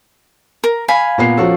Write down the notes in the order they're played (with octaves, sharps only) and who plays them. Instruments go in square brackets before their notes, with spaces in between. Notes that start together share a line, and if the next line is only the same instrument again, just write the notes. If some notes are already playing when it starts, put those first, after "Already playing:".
[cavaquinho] A#4
[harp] F5 [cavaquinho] G#5 B5
[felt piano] A#2 B3 C7 [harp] A#5
[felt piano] F3 C#4 [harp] F#4 A4